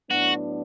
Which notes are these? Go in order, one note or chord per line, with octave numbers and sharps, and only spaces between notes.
A2 F#3 B3 D4 F#4